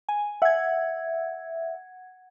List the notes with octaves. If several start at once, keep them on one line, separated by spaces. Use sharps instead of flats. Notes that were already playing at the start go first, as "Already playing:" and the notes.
G#5
E5 F#5 G#6